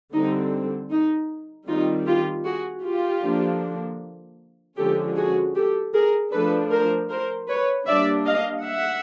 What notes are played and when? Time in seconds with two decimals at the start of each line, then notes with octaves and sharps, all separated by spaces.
0.13 D3 G3 C4 D#4
0.91 D#4
1.68 D#3 G3 C4 D#4 F4
2.06 F4 G4
2.45 F#4 G#4
2.83 F4 G4
3.23 D3 F3 A#3 D4
4.77 D3 F3 G#3 C#4 G4 A4
5.16 F#4 G#4
5.54 G4 A4
5.94 G#4 A#4
6.32 F3 A3 D4 A4 B4
6.71 A#4 C5
7.09 A#4 C5
7.48 B4 C#5
7.87 G3 A#3 D4 D5 E5
8.26 D#5 F5
8.64 E5 F#5